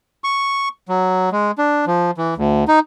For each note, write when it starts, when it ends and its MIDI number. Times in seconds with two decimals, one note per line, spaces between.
0.24 0.69 85
0.89 1.30 54
1.32 1.51 56
1.58 1.85 62
1.87 2.11 53
2.17 2.34 52
2.37 2.64 38
2.68 2.79 63